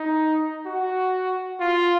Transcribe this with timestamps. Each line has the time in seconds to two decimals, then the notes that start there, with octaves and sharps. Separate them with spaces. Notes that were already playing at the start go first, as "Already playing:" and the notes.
Already playing: D#4
0.66 F#4
1.60 F4